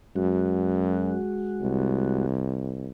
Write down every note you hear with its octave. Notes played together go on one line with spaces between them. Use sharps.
F#2 G#3 F#4
C2